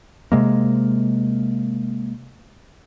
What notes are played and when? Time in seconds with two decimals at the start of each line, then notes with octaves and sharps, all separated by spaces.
0.32 C3 G#3 A#3